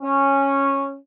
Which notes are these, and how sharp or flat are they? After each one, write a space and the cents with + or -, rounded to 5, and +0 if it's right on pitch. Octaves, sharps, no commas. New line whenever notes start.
C#4 -10